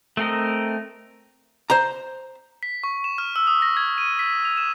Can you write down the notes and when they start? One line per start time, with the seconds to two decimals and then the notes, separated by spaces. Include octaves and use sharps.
0.17 A3 C4 A#4 D#5
1.70 C5 A#5
2.63 B6
2.84 C#6
3.04 E7
3.18 F6
3.36 E6
3.47 D#6
3.62 A#6
3.77 G#6
3.98 D#7
4.19 B6
4.45 F7
4.57 E7